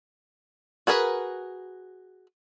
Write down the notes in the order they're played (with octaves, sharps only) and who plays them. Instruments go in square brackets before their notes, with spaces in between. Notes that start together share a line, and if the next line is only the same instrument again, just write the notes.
[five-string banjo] F#4 G#4 A#4 B4